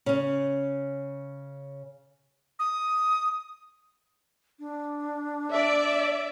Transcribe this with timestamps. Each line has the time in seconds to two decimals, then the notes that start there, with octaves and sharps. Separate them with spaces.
0.06 C#3 C#4
2.59 D#6
4.60 D4
5.51 D5 E5